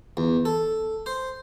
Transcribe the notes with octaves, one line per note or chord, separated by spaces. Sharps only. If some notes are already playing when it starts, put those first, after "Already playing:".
E2
A4
C5